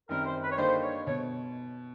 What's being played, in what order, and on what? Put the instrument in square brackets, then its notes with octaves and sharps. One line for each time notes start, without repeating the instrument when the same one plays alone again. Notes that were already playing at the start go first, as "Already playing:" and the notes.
[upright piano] F#2 D#3 G3 C4 [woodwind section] A#4
[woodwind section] C5
B4
C#5
[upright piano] D3 G3 A#3 D#4 G4 [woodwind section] C5
[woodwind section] C#5
[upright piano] B2 [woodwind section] C#5